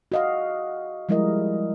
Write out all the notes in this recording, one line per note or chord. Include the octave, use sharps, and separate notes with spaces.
F#4 D#5 F5
F3 G3 G#3 E4 A#4 D#5